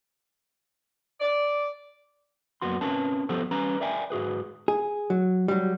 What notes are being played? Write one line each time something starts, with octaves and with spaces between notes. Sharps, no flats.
D5
F#2 A#3 B3 F#4 C6
C4 C#4 A#4 B4 A5
F3 B3 G4 A4 C5
G3 C#4 B4 A#5
A#4 D5 E5 G5 G#5
G#2 F#4 G#4 B4
G#4
F#3
F#3 G3